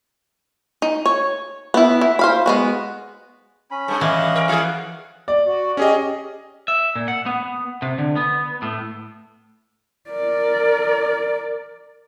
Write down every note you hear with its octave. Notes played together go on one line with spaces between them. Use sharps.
D#4
C#5
B3 E4
E4
C5 F5 B5
G#3 B3 F#4
C#4 B5
G2 G3 A4
E3 D#5 F5 F#5
A#4
E3 G#4 F5 F#5
D5
F#4
C#4 G4 G#4 D#5
E5
A#2
F#5
B3
C3
D3
B3
A2
A#4 D5